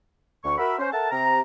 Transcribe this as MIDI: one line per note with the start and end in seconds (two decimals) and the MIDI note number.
0.44 0.55 38
0.44 0.55 85
0.58 0.75 66
0.58 0.75 70
0.58 0.75 76
0.58 0.75 83
0.79 0.91 61
0.79 0.91 72
0.92 1.08 69
0.92 1.08 70
0.92 1.08 76
0.92 1.08 78
0.92 1.08 81
1.11 1.40 48
1.11 1.40 82